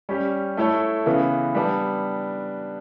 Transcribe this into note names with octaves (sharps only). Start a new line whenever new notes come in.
G3 C#4 G4
A3 E4 A4 C#5
C#3 E3 B3
G3 B3 D4